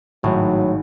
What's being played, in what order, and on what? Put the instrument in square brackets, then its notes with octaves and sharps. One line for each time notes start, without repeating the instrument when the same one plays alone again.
[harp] G#1 [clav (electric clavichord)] A2 [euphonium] F#3